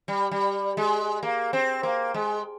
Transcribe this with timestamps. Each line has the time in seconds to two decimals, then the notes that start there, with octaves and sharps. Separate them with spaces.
0.08 G3
0.31 G3
0.77 G#3
1.23 A#3
1.53 C4
1.83 A#3
2.14 G#3